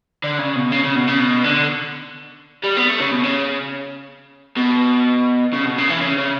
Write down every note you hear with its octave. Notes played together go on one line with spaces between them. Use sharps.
D3
C#3
B2
C#3
C#3
B2
C#3
B2
D3
G3
B3
A3
C#3
B2
C#3
B2
C#3
B2
C#3
E3
C#3
C#3